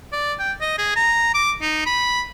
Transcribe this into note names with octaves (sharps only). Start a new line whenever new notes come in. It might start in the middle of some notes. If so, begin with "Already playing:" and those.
D5
G5
D#5
G#4
A#5
D6
D#4
B5